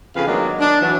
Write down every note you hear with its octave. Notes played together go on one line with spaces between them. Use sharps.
F2 C#3 B4 F5
D#3 F#3 G#3 A#3 B3 D4
D4
E3 F#3